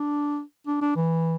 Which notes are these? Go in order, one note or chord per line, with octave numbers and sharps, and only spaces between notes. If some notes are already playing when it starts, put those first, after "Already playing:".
Already playing: D4
D4
D4
E3